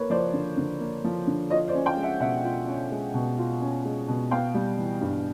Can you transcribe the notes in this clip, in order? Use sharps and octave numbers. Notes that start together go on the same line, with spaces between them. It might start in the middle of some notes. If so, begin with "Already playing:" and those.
Already playing: A#3 A#4 B4 C#5
F3 C5 D5
D3
D3
A#3
F3
D3
F4 C#5 D#5
C5 D5
C#4
F5 G5
G#3
E5 F#5
B2 E5 F#5
F4
C#4
G#3
B2
F4
C#4
G#3
B2
B3 F5 G5
G3
E3
G2